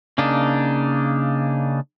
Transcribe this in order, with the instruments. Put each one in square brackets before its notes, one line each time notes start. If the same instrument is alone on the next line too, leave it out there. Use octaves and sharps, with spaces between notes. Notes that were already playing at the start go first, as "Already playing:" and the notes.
[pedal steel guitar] C#3 A#3 D4 D#4